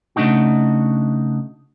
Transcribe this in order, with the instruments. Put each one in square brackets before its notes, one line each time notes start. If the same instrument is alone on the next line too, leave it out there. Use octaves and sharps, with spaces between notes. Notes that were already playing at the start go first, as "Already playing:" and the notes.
[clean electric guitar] C#3 A3 D4 D#4 F#4